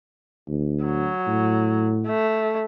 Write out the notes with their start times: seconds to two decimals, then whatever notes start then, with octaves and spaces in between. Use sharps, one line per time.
0.49 D2
0.84 F#3
1.27 A2
2.08 A3